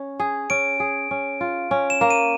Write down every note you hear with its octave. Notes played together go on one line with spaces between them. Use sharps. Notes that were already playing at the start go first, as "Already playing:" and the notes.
Already playing: C#4
G#4
C#4 D7
G#4
C#4
F4
C#4
E7
A#3
D#7